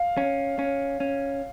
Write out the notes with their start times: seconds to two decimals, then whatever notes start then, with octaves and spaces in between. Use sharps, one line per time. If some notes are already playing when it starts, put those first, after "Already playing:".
Already playing: F5
0.17 C#4
0.59 C#4
1.00 C#4